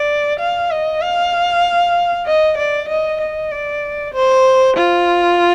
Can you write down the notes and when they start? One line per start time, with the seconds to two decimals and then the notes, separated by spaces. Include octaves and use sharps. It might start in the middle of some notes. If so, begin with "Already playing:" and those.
Already playing: D5
0.39 F5
0.71 D#5
1.01 F5
2.26 D#5
2.57 D5
2.89 D#5
3.21 D#5
3.51 D5
4.14 C5
4.77 F4